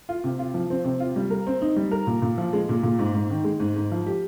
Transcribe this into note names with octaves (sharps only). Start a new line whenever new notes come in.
F4
C3
F4
F3
C4
C3
F4
G3
A#4
C4
D#4
G3
A#4
A#2
A#2
F3
G#3
A#2
A#2
G#2
G#2
D#3
G#3
G#2
G#2
F3
G4